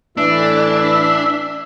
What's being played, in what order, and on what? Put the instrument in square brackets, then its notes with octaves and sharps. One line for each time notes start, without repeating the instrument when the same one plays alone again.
[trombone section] A2 E3 [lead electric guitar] D4 [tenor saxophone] E5